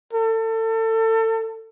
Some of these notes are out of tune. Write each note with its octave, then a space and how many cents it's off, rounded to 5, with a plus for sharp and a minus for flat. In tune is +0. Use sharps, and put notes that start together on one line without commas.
A4 +30